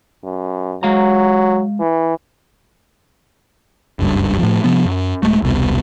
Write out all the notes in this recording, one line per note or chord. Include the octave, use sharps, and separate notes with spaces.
F#2
F#3 G#3 F5 A#5
E3
F#1 C#2 G2
A2 F3
C3 F3 B3
F#2
D#1 G2 G#3 A3
E1 C2 B2